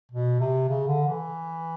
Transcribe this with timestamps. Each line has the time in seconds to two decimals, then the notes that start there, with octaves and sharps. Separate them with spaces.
0.12 B2
0.40 C3
0.69 C#3
0.88 D3
1.07 E3